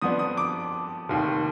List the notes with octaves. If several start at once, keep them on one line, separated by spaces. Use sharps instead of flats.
F2 F3 B3 D4 D#6
D#6
D6
F1 D#2 D#3